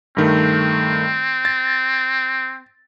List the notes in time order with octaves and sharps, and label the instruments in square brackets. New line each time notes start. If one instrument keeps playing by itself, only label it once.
[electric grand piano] G2 D#3 A3 [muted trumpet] C4
[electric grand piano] A6